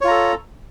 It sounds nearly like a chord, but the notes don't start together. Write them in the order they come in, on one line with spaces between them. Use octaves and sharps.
C#5 F4 A#5 A4